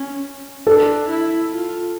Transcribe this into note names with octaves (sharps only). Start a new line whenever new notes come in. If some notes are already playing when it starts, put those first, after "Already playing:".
Already playing: C#4
D4 A4
E4
F4